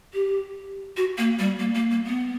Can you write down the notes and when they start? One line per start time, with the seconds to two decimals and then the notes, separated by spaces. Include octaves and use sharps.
0.14 G4
0.97 F#4
1.18 A#3
1.39 G3
1.59 A#3
1.75 A#3
1.91 A#3
2.07 B3